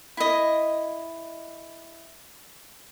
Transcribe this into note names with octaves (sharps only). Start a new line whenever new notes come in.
E4 D#5